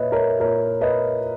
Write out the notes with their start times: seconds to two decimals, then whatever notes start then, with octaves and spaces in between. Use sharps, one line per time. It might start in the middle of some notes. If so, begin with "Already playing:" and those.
Already playing: A#2 B4 C#5 D#5 E5
0.12 A#4 C#5
0.40 A#2 A#4 C#5
0.81 B4 D#5